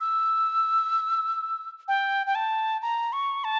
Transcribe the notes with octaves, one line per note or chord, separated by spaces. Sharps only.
E6
G5
G5
A5
A#5
C#6
A5